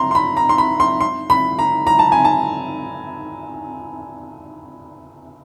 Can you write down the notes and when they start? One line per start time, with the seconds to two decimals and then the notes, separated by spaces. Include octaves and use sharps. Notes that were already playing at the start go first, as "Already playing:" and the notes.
Already playing: A#5 C6
0.11 C6
0.15 B5
0.37 A#5
0.49 C6
0.58 B5
0.80 C6
1.01 C6
1.30 B5
1.59 A#5
1.87 A#5
1.99 A5
2.12 G#5
2.25 A5